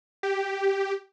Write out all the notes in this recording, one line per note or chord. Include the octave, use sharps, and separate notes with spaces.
G4